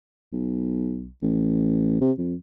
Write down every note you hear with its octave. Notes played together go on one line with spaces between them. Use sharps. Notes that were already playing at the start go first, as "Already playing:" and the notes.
B1
A1
C3
F2